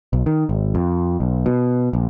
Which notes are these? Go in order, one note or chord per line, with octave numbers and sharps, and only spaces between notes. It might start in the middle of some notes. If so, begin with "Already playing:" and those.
B1
D#3
G#1
F2
B1
B2
A#1